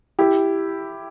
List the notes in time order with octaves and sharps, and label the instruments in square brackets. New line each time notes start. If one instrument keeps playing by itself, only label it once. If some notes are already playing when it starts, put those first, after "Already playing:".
[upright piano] E4 G4